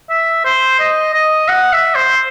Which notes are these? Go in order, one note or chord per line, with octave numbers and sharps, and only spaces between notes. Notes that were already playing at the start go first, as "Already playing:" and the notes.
E5
C5
D#5
D#5
F#5
E5
C5